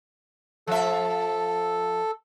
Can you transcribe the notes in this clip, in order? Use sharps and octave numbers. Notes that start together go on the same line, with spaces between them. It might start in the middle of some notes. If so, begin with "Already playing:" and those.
F3 A4 E5